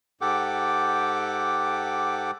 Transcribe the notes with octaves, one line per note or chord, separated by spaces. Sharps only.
G#2 G4 A4 F#5 G5 D6